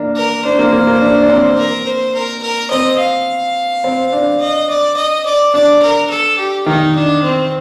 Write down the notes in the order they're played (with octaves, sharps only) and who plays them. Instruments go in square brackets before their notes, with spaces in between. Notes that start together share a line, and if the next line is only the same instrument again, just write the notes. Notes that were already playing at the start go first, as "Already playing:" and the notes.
Already playing: [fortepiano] A#3 D4
[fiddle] A#4
[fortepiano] D4 [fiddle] C5
[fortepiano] A#3
A#3
A#3
D4
D4
C4
[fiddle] A#4
C5
A#4
A#4
[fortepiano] C4 [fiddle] D#5
[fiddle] F5
[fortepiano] C4
D4
[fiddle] D#5
D5
D#5
D5
[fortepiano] D4 [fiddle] D5
[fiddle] A#4
A4
G4
[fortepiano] D#3 [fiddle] D#4
[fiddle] D4
C4